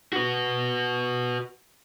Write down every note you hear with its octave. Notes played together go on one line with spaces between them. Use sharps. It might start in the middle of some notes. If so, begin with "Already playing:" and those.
F#4 B4